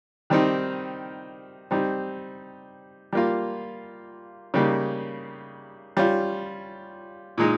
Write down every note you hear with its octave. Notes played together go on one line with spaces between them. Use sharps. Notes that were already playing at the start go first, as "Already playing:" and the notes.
D#3 G3 C4 D#4
G3 C4 D#4
G3 A#3 F4
C#3 G3 A#3 D#4
G3 C#4 F4
A#2 G#3 D#4